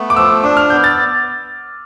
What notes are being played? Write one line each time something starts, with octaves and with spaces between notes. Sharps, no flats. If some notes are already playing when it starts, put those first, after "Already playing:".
Already playing: A3 B3
D6
F3 E6
D4 D6
F6
B3 G6
A6